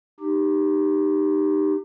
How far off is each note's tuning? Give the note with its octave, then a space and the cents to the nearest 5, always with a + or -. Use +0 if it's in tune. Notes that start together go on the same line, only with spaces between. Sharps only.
D#4 -20 G4 +0